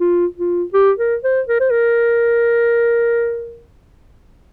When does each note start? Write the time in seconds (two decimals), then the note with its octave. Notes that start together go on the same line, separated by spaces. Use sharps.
0.01 F4
0.38 F4
0.74 G4
0.99 A#4
1.24 C5
1.49 A#4
1.60 C5
1.71 A#4